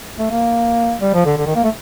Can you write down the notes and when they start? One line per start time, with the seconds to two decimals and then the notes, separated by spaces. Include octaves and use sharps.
0.19 A3
0.31 A#3
1.01 G3
1.14 F3
1.25 D3
1.37 D3
1.46 D#3
1.55 A#3
1.64 A3